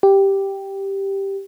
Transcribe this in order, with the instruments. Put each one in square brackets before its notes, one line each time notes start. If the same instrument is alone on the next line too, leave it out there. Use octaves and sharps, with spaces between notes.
[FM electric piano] G4